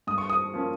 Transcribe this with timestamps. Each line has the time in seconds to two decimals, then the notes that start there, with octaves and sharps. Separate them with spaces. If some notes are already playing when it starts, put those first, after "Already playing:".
0.07 G2 D#6
0.18 C#6
0.30 D#6
0.54 F3 A#3 C#4